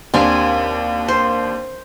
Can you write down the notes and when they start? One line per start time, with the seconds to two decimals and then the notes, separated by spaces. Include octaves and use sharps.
0.14 D#2 C4 D4 G4 A#4 G#5
1.08 C5